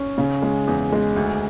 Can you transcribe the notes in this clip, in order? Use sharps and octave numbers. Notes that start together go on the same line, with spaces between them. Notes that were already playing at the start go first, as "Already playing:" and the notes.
Already playing: C#4
C#3
G#3
E2
G#3
D2